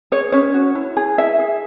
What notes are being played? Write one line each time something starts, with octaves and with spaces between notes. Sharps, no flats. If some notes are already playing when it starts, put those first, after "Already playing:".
G#4 C#5
C#4 C#5
F#4
E4
G#4
E4 E5
G#4